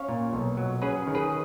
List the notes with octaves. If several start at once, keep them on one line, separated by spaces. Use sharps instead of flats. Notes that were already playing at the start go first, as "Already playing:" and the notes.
Already playing: C#4 C#5 F5
A#2
B1
F#3
C#4 G#4 B4
D#3
G#4 B4